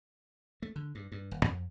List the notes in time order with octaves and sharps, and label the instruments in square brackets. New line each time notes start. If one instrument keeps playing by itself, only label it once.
[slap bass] A3
D3
G2
G2
D#1
F2